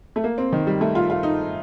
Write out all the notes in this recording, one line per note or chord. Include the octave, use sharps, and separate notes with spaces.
A3
A#3
C4
D#3
G3
A3
F4
F4
D#4